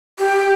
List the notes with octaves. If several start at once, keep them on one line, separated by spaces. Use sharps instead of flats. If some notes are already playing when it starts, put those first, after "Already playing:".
G4